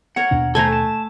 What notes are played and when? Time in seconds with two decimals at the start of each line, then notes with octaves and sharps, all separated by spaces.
0.16 A#4 C#5 F#5 A#5
0.31 D#2 B2 D4
0.55 A3 A4 C5 G#5 A#5
0.72 A5